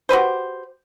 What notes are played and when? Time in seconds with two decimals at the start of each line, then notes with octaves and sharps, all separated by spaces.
0.09 F#4 G4 B4 C5